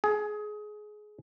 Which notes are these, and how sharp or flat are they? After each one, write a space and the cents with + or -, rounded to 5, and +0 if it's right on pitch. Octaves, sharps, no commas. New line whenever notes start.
G#4 +20